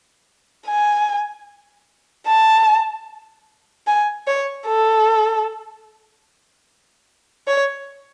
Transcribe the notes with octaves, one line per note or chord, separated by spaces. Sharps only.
G#5
A5
G#5
C#5
A4
C#5